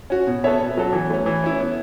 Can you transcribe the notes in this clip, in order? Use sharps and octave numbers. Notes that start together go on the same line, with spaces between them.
C#4 F#4
B2
B3 A4 C#5 E5
B2
F#3 C#4 F#4 A4
E3
A3 C#4
E3
C#4 E4
B3